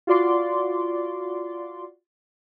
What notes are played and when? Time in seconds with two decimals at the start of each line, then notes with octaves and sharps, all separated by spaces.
0.07 F4 F#4 D5 C6 D6